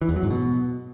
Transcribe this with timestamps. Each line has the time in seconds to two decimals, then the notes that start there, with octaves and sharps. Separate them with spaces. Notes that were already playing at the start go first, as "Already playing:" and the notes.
0.02 E3
0.09 E2
0.16 F#3
0.23 G#2
0.30 B2